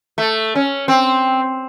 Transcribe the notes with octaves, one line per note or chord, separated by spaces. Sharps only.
A3
C#4
C4